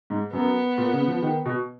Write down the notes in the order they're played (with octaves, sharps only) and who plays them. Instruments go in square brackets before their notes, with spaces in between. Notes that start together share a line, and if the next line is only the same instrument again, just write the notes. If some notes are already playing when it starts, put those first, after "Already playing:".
[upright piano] G#2
[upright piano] F#2 [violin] B3
[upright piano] A#2
C#3
F3
D#3
B2